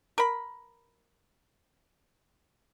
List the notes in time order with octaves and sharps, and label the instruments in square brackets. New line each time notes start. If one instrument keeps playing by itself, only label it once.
[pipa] A#4 B5